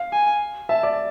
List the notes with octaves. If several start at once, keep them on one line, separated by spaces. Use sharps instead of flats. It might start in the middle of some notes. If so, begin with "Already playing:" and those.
Already playing: F5
G#5
E5 A5
D5